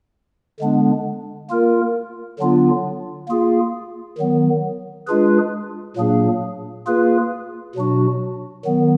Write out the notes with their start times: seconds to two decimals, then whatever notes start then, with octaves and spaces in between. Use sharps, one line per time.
0.60 D3 G#3 B3 D4
1.49 A#3 F4 A#4
2.39 D3 F#3 B3 D4 F4
3.28 A#3 F4 G#4
4.18 D#3 F#3 B3
5.07 G#3 D4 F4 G#4 B4
5.96 A#2 F#3 A#3 D4 G#4
6.87 A#3 F4 G#4 B4
7.75 B2 F#3 D4 F#4
8.65 D#3 F#3 B3